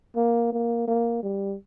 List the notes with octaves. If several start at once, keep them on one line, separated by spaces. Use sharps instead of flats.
A#3
A#3
A#3
G3